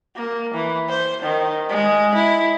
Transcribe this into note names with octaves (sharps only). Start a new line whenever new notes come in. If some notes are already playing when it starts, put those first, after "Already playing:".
A#3
E3
C5
D#3
G#3
E4